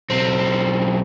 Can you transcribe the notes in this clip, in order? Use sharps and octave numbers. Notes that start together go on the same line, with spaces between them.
B1 C4